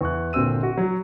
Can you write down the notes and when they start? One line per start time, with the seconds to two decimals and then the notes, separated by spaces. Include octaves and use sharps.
0.01 E2 C#6 F#6
0.33 G1 A#2 C4 F#4 E6 D#7
0.63 F#4
0.78 F#3